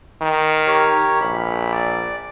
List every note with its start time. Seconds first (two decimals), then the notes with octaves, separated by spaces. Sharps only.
0.22 D#3
0.67 G4 A#4 C#5
1.21 A#1 B5
1.73 D5